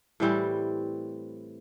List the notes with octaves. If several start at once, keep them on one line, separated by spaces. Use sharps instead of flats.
A2 E3 G3 C4